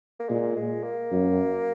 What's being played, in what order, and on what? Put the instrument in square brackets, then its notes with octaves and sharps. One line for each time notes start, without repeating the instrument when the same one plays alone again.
[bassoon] A#3
[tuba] A#2 [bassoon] G#3
[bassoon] G#3
A#3
[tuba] F#2